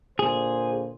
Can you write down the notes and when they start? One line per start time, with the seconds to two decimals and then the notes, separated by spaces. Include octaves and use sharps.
0.19 A#2 D3 G#4 C5